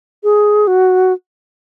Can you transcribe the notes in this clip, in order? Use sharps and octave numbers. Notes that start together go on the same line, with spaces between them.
G#4
F#4